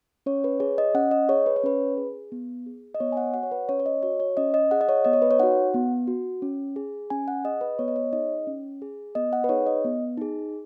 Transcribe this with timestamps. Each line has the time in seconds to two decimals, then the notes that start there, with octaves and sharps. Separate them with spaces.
0.26 C#4 C#5
0.44 B4
0.60 G#4 C#5
0.78 D#5
0.95 C#4 F#5
1.11 D#5
1.29 G#4 C#5
1.46 B4
1.56 C#5
1.64 C#4 B4
1.97 G#4
2.32 B3
2.66 G#4
2.95 D#5
3.00 B3 C#5
3.12 G#5
3.17 F#5
3.34 F#4 F#5
3.43 C#5
3.52 B4
3.69 C#4 C#5
3.80 C#5
3.86 D#5
4.03 F#4 C#5
4.20 C#5
4.37 C#4 D#5
4.54 D#5
4.71 G#4 F#5
4.81 D#5
4.89 C#5
5.05 B3 D#5
5.13 C#5
5.22 B4
5.31 C#5
5.40 D#4 F#4 F#5
5.74 B3
6.07 F#4
6.42 C#4
6.76 G#4
7.10 C#4 G#5
7.28 F#5
7.44 G#4 D#5
7.61 B4
7.79 B3 C#5
7.88 D#5
7.96 C#5
8.13 D#4 G#4 D#5
8.47 C#4
8.82 G#4
9.15 B3 D#5
9.33 F#5
9.44 B4
9.49 D#4 G#4 C#5
9.66 D#5
9.84 B3
10.18 D#4 G#4